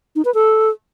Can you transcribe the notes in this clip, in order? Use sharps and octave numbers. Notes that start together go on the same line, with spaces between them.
D#4
B4
A4